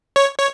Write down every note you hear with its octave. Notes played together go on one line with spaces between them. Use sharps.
C#5
C#5